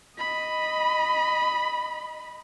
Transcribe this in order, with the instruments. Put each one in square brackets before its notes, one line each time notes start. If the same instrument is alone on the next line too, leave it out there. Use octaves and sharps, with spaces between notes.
[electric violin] D#5 B5